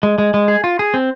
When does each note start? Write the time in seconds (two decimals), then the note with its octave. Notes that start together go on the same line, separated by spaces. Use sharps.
0.03 G#3
0.18 G#3
0.34 G#3
0.48 G#4
0.64 F4
0.79 G#4
0.94 C4